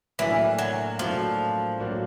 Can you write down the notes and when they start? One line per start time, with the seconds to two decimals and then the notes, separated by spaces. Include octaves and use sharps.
0.19 A2 E3 F#3 A#3 D4 F#4
0.59 F#3
0.99 A2 F3 F#3 A#3 D4 F#4
1.79 A2 F#3 A#3 D4 F#4